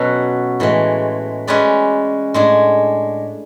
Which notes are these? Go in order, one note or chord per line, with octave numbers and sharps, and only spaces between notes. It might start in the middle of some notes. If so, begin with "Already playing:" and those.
Already playing: B2 F#3 C#4 F#4 A4
A2 E3 G#3
G#3 C#4 G#4 B4 D5
A2 G#3 D4 G#4